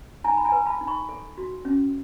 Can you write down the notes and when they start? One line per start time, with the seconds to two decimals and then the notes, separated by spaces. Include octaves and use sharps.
0.24 D#4 G#5 A#5
0.37 B5
0.45 G#5 A#5
0.52 B4
0.66 A5 B5
0.81 D#4
0.87 B5 C#6
1.09 A4
1.38 F#4
1.65 C#4